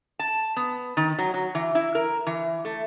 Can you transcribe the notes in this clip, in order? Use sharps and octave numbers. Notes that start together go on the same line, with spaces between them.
A5
B3
D#3
F#3
F#3
E3
E4
A#4
E3
A3